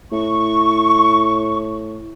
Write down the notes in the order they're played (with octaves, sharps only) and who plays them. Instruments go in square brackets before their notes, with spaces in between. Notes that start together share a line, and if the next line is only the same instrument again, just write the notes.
[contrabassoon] A2 [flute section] C#6